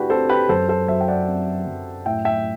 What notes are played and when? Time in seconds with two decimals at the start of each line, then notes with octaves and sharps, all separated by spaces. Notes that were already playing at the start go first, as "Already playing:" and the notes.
Already playing: D3 A3 D4 E4 F#4 G4 B4
0.10 C4 A4 C5
0.29 G4 B4
0.49 F#2 A4 C5
0.69 A4 C5
0.88 F#3 C5 E5
1.01 G5
1.08 D5 F#5
1.27 C4
1.67 F#2
2.06 A2 E5 G5
2.25 E5 G5